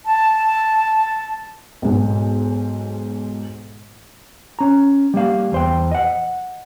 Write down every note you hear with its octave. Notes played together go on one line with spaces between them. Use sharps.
A5
B1 G#2
C#4 A#5
G3 A#3 F5
E2 C5 G5
D#5 F#5